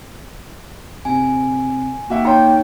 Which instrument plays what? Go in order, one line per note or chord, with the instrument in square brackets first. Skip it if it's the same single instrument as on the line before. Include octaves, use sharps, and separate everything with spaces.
[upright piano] C3 [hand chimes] G#5
[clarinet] A#3 [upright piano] F#4 E5 G5
[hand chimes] D#4 C#5 [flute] G5 [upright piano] A#5 C6